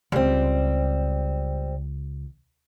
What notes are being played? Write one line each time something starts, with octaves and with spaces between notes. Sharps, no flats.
C#2 G3 C4